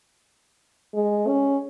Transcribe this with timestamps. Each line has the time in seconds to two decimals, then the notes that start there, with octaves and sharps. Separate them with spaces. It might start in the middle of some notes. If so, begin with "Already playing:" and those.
0.94 G#3
1.27 C#4